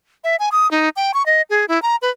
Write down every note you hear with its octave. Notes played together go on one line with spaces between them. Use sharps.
E5
G#5
D#6
D#4
G5
C#6
D#5
G#4
E4
A#5
B4